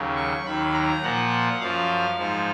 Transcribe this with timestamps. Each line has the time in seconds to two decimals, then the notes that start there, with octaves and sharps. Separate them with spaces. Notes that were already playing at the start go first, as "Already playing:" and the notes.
Already playing: D#2 C#3 F#3
0.16 C#6
0.45 D#2 D#3 F#3 B5
0.74 A#5
1.02 A#2 F3 F#5
1.60 F#2 F3 F5
2.18 G#2 F3